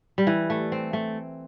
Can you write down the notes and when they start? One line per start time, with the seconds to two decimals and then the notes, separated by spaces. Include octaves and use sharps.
0.18 G3
0.27 E3
0.50 A3
0.72 C4
0.93 A3